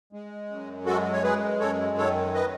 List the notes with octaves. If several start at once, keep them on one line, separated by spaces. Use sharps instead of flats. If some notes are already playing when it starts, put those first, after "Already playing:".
G#3
F#2
G#3 F#4 A4
C#5
G#3 G#4 B4
F#2 A4 C#5
D#3 A4 C#5
B4 D#5